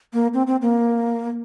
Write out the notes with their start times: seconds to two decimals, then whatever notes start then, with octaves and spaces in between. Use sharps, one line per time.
0.13 A#3
0.34 C4
0.47 C4
0.62 A#3